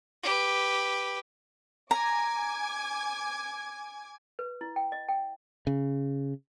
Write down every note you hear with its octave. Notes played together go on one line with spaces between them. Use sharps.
G4 B4
G#5 A#5 D6 G#6
B4
E4
G5
D#5
G5
C#3